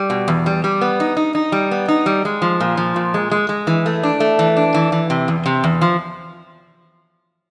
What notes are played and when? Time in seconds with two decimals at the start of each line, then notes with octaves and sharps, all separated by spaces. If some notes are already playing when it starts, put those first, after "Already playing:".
Already playing: G3
0.10 B2
0.28 E2
0.46 G3
0.64 G3
0.81 B3
1.00 D#4
1.17 D#4
1.35 D#4
1.52 G3
1.71 B3
1.88 D#4
2.06 G3
2.25 G#3
2.42 F3
2.60 A#2
2.77 F3
2.96 A#2
3.14 G#3
3.31 G#3
3.49 G#3
3.67 E3
3.86 A3
4.03 D4
4.20 A3
4.39 E3
4.57 D4
4.74 E3
4.92 E3
5.10 C3
5.28 E2
5.46 C3
5.64 E2
5.81 F3